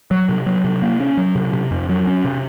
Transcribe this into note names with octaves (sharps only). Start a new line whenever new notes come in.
F#3
C3
F#3
C3
A#3
C#4
F#3
C3
C3
F2
F#3
C#4
C3